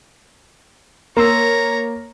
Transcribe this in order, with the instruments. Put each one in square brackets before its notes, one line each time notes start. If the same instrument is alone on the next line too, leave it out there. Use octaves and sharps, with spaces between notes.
[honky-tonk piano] A#3 [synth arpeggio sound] A#4 C6 E6 [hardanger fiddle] C#5 A#5